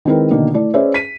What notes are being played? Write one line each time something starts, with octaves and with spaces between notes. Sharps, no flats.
D#3 G#3 C4 E4 A#4 B4
B2 D3 D#3 A#3 D#4
A3 E4 D5
C#4 G#4 B4 C5 D5 E5
B6 D#7